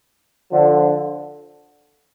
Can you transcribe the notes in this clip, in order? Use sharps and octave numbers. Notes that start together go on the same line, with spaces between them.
D3 F3